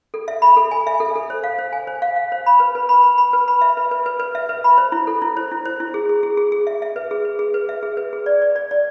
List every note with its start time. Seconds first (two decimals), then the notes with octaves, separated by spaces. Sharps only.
0.14 A4
0.28 E5
0.42 B5
0.57 A4
0.71 G#5
0.87 E5
1.00 A4
1.16 A4
1.30 C5
1.44 F5
1.58 C5
1.73 G#5
1.87 C5
2.02 F5
2.16 F5
2.32 C5
2.46 B5
2.60 B4
2.75 B4
2.89 B5
3.03 B5
3.18 B5
3.33 B4
3.48 B5
3.61 E5
3.77 B4
3.91 B4
4.06 B4
4.20 B4
4.35 E5
4.49 B4
4.64 B5
4.78 C5
4.92 E4
5.07 A4
5.22 E4
5.37 C5
5.51 E4
5.65 C5
5.80 E4
5.94 G#4
6.09 G#4
6.23 G#4
6.37 G#4
6.52 G#4
6.67 E5
6.82 E5
6.96 B4
7.11 G#4
7.25 B4
7.39 G#4
7.54 B4
7.69 E5
7.83 G#4
7.97 B4
8.13 G#4
8.26 D5
8.42 D5
8.56 D5
8.71 D5